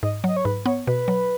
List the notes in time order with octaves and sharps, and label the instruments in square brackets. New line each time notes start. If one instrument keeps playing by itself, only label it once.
[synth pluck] G#2 [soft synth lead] D#5
[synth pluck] F#3 [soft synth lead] D#5
[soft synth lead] C#5
[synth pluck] G#2 [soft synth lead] B4
[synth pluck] B3 [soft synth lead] C#5
[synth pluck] B2 [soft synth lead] B4
[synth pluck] F#3